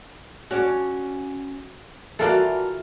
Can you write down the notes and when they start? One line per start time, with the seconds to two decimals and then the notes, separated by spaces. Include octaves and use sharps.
0.51 C#4 F#4 C#5 D5
2.19 E3 F4 F#4 A4 A#4 D5